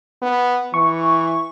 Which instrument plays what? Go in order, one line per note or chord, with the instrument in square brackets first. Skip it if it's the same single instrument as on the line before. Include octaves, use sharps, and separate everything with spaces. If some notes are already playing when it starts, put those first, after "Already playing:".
[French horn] B3
[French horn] E3 [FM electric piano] C#6